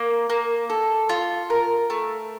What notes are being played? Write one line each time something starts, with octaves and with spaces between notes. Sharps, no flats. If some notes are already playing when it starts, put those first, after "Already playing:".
Already playing: A#3
A#3
A4
F4
A#4
A3